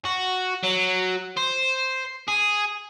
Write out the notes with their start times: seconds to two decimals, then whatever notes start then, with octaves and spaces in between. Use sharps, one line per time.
0.05 F#4
0.63 F#3
1.37 C5
2.28 G#4